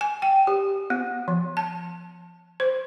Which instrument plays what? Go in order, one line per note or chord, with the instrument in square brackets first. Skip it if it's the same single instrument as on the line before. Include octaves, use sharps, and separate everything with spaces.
[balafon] G#5
G5
G4
B3
F3
A5
C5